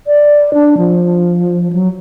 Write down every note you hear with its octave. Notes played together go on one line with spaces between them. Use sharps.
D5
D4
F3
F#3